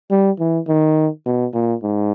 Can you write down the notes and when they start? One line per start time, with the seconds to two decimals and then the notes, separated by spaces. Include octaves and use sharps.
0.11 G3
0.39 E3
0.68 D#3
1.26 B2
1.54 A#2
1.83 G#2